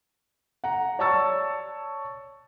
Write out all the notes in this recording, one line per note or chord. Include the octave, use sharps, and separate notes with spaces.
F#5 A#5
C#5 D5 A5 C#6 E6 A6